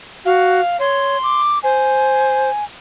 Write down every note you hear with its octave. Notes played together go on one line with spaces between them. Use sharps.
F#4 F5
C#5 C6
D6
C5 G#5